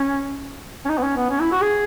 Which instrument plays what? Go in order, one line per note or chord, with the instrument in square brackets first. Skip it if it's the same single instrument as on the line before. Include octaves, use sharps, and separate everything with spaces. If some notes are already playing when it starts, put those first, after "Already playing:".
Already playing: [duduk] C#4
C#4
D#4
B3
C#4
B3
C#4
E4
F#4
G#4